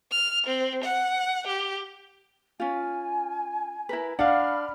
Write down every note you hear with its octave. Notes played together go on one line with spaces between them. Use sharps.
F6
C4
F#5
G4
C#4 F4 G#5
E4 A#4 B4
D4 F5 F#5 B5 F6